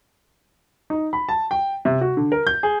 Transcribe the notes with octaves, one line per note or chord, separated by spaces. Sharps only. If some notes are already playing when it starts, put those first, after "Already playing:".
D#4
B5
A5
G5
C3
F#4
D3
A#4
G6
G#4